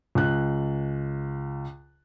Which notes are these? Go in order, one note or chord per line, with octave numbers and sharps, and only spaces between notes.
C#2 F#6